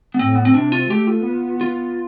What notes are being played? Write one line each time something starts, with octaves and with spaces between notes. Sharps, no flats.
B3
A2 C4
B3
C4
C3 D4
F4
A3 G4
F4
B3
F4